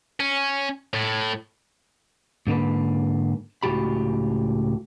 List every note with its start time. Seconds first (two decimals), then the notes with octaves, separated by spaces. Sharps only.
0.20 C#4
0.94 A2
2.47 G#2 D3 A#3 B4
3.63 C#2 A2 E3 F#4 G4 B5